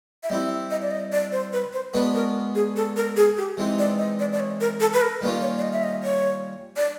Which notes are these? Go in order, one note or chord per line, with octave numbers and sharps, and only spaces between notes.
E5
G3 C4 E4 D#5
D#5
D5
D#5
D5
C5
B4
C5
G#3 B3 D4 F#4 B4
A#4
G#4
A4
A#4
G#4
G4
E3 G#3 C4 D#4
D5
D#5
D5
D5
C#5
A#4
A4
B4
A#4
D#3 G3 A#3 C#4 F4 B4
C#5
D5
D#5
E5
D#5
C#5
D5